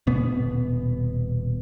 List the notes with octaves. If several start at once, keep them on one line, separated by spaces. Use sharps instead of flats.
D#1 B2 B3